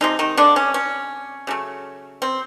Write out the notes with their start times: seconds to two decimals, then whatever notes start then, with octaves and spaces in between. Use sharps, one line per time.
0.01 C3 D#3 F3 G#3 D#4
0.19 D#3 D#4
0.37 D3 D4
0.56 C#4
0.74 C#4
1.47 C#3 F#3 A3
2.22 C4